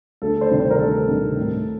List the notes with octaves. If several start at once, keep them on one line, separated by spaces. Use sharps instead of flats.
D2 A4
C5
C3 D#3 G3
C5
A#4
D2 A4
C3 D#3 G3
A2